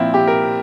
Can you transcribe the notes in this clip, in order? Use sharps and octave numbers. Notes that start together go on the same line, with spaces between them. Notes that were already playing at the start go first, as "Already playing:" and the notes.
Already playing: A#2 F3 C4 E4
G4
A#4